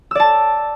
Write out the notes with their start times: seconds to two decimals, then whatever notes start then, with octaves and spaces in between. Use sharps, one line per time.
0.11 E6
0.15 D5
0.20 A5